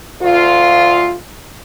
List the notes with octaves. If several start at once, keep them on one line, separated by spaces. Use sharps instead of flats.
D2 F4